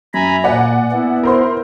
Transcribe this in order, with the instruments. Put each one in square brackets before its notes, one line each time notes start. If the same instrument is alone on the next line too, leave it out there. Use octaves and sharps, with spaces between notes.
[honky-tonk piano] F#2 [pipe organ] G#5 A#5 B5
[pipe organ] A#2 [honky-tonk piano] D5 F#5 G#5
[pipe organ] B3 E4
[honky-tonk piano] A#4 C5 C6